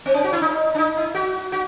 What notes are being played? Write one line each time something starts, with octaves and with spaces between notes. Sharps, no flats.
C4
C#4
F#4
E4
D#4
D4
D#4
E4
F#4
F#4